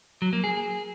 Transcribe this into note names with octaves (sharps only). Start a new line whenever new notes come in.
F#3
A#3
G#4